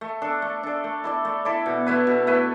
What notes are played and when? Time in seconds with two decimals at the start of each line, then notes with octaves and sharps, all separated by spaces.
0.01 A3
0.22 D4 A4
0.42 A3
0.63 D4 A4
0.84 A3
1.04 E4 A4 D5
1.25 A3
1.45 E4 A4 D5
1.66 B2
1.86 A3 E4 B4
2.07 B2
2.27 A3 E4 B4